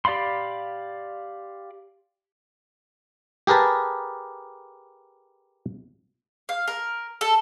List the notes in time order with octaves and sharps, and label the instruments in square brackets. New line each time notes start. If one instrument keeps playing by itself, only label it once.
[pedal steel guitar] G4 D5 F5 B5 C6
[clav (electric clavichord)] G4 G#4 A#4 B4 A5
[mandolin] F5
A#4
A4